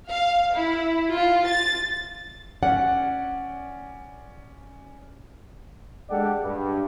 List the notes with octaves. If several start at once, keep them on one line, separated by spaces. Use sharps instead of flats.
F5
E4
F4
A6
C#4 D5 F#5
G#3 D4 G4 A4 D5 F#5
G2